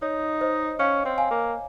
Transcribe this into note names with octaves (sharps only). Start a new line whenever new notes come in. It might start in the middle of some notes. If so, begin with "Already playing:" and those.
D#4 C#5
C5 D#5
C#4 C#5 F5
C4
F5 G#5
A#3